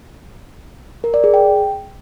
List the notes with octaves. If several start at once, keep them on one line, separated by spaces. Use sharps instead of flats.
A#4
D5
G#4
G5